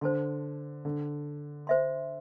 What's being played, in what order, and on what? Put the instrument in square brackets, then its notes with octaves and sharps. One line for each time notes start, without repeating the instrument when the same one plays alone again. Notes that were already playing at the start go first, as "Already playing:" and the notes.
[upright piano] D3 [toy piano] C5 A5 C6
[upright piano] D3
[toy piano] C5 E5 C6